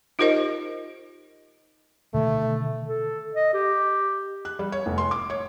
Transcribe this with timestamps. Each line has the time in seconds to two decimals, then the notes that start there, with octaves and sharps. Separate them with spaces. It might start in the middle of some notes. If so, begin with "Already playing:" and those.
0.19 D#4 F4 G4 A#4 C5 D#5
2.14 B2 D3 D#3 A3
2.88 A4
3.34 D#5
3.54 G4
4.45 F#6
4.59 G3
4.72 C#5
4.86 F1
4.98 C6
5.11 D6
5.30 C#5